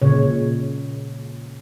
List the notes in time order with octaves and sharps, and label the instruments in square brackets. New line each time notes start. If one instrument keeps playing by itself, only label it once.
[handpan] A#2 C#3 C#5